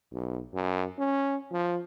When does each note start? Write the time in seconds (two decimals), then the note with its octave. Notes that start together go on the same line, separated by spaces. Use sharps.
0.13 B1
0.54 F#2
0.98 C#4
1.52 F3